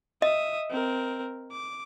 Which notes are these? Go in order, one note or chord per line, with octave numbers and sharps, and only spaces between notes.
D#5 E5 D#6
C4 A#4
D6